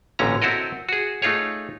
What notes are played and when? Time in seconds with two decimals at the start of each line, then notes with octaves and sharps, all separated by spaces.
0.19 A1 A#2 D3 C#4 A#5
0.42 C4 E4 F#4 A4 A#4 D#5
0.89 F#4 G#4
1.22 A3 D#4 F4 G#4 C#5